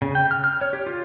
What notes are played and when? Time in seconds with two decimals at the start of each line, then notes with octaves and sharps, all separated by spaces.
0.02 C#3
0.15 G5
0.31 F6
0.44 F6
0.61 C#5
0.73 G4
0.87 F4